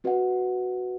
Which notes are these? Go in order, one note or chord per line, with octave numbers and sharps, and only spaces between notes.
C4 F#4 B4 D#5 F#5